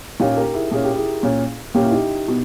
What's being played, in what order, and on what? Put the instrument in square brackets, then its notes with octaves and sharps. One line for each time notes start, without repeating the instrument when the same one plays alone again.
[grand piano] A#2 A#3 C#4 [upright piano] D#4 G4
[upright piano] G4 A#4
E4 G#4
[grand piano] A#2 A#3 C#4 [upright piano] G#4
[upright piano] G4
E4 G#4
[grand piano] A#2 A#3 C#4
[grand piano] A#2 A#3 C#4 [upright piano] G4
[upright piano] E4
D#4 G4
[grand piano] B2